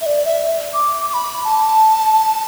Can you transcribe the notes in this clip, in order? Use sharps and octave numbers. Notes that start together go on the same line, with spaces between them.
E5
D5
E5
D6
D6
B5
A5